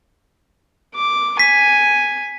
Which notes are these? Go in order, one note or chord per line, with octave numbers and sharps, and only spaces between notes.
D6
G#5 B6